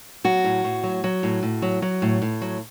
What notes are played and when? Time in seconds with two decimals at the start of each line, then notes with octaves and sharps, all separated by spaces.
0.24 F#3 F#4
0.44 A2
0.64 A2
0.83 F#3
1.04 F#3
1.23 A2
1.43 A2
1.62 F#3
1.82 F#3
2.02 A2
2.22 A2
2.41 F#3